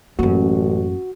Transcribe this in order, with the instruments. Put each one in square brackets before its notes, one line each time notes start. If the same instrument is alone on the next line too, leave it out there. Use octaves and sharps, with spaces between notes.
[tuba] A1 [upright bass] F#2 A#3 [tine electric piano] F#4